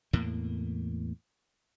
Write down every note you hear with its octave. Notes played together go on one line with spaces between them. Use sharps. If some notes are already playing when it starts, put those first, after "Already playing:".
E2 A2 A#3